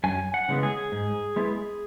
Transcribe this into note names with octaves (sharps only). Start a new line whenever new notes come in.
F#2 G#5
F#5
C#3 E3 G#3 B3
G#4
G#2
G#3 B3 E4